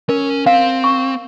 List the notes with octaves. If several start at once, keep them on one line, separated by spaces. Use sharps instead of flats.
C#4 A#4
C4 F5
C#6